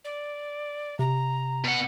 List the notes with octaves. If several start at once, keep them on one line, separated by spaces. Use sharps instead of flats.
D5
C3 A#5
B2 F#5